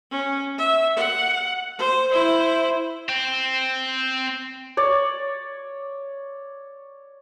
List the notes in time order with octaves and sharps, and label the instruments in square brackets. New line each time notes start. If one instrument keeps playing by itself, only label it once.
[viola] C#4
E5
F#5
C5
E4 C5
[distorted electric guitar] C4
[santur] C#5 D5